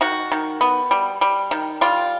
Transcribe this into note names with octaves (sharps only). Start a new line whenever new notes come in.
D#3 F#4
D#3
B3
G3
G3
D#3
G3 F4